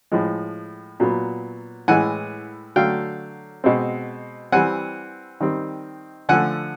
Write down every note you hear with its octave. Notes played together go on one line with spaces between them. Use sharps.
A2 F3 G#3
A#2 F#3 B3
A2 E3 G#3 F#5 G#5
D3 F#3 A3 F5 G5
B2 G#3 C4
E3 G3 C4 F#5 G#5
D#3 G3 C4
D3 F3 A3 F#5 G#5